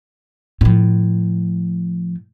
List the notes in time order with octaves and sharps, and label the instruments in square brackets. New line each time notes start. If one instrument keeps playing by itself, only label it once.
[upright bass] A2 F3